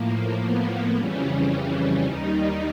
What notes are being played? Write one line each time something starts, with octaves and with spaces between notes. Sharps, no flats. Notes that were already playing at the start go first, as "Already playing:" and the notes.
Already playing: A2 F3 A#3
B3
F2 C#3 E3 G3 C#4
C#4
D#2 D#3 G3 D#4